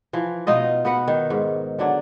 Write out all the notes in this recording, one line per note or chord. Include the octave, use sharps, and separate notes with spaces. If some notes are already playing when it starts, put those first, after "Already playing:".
E3 F3
B2 D#4 F4 D#5
B3 F#4 B4 F#5
D#3
G#2
D3 F#3 D4